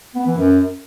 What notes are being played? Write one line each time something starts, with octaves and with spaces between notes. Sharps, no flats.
B3
E3
F#2